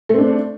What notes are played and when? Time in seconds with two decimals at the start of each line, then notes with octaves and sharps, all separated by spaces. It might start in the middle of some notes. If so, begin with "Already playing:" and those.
0.09 A3
0.14 C4
0.18 D4